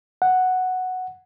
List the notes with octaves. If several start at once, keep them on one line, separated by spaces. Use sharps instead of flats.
F#5